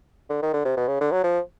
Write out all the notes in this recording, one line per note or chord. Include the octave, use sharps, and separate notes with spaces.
D3
D#3
D3
C3
B2
C#3
D3
F#3
F3